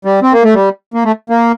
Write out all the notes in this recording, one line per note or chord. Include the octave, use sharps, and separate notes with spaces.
G3
C4
A#3
A3
G3
A#3
A3
A#3